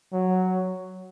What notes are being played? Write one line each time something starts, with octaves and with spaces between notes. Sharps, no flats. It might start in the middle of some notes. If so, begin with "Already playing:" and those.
F#3